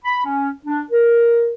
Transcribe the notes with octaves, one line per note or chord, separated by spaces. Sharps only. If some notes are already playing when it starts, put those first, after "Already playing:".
B5
C#4
D4
A#4